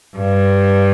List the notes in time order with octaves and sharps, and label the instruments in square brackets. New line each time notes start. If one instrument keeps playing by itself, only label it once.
[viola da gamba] G2